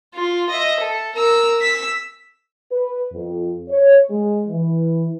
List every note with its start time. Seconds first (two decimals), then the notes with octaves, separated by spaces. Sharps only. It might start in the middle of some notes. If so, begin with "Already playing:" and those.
0.14 F4
0.50 D#5 E5
0.80 A4
1.15 A#4 E6
1.59 E6 B6
2.71 B4
3.12 F2
3.69 C#5
4.10 G#3
4.48 E3